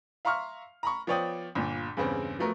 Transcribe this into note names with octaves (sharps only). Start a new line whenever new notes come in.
E5 F5 A#5 C6 C#6 F6
A#5 B5 C#6
F3 B3 C#5 D5 G5 D#6
G1 A#2
E2 G2 C#3 B3 C4
F3 F#3 A3 B3 A#4